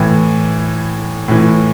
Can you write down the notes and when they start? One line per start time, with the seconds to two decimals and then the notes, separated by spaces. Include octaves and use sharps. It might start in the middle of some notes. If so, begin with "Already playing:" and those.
Already playing: A2 E3
1.28 A2 E3